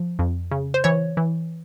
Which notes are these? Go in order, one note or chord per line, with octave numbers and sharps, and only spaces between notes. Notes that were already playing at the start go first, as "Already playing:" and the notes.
Already playing: F3
F2
C#3
C5
E3 C#5
E3